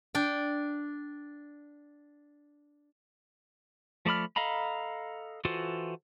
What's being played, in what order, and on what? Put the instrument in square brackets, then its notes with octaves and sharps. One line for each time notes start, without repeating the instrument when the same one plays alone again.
[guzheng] D4 G5
[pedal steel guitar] F3 A3 D5 B5 F6
A4 D#5 F5 A#5 B5
E3 F4 F#4 A4 C5